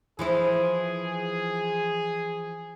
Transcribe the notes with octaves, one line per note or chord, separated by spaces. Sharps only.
E3 F3 E4 G#4